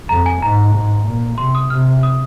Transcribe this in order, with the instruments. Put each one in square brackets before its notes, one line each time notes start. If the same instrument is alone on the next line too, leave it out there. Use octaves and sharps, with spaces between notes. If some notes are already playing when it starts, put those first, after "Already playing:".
[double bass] F2 [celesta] A#5
[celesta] G#5
[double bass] G#2 [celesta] A#5
[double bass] G#2
A#2
[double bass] C3 [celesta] C6
[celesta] D#6
[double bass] C3 [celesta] F6
[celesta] D#6